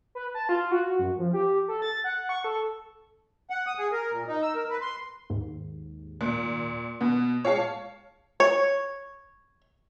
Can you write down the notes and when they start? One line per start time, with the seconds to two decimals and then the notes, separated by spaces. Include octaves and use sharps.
0.15 B4
0.34 A5
0.49 F4
0.71 F#4
0.99 F#2
1.18 F3
1.33 G4
1.68 A4
1.82 A6
2.04 F#5
2.29 C#6
2.44 A4
3.50 F#5
3.67 D#6
3.78 G#4
3.92 A#4
4.12 A#2
4.28 D#4
4.42 E6
4.55 A#4
4.70 B4
4.81 C6
5.30 D#2 G#2
6.21 A#2
7.01 B2 B3
7.45 A#2 G#3 C#5 F5 A5
8.40 C#5